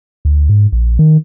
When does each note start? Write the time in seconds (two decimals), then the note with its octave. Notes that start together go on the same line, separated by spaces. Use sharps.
0.25 D2
0.49 G#2
0.72 A#1
0.99 D#3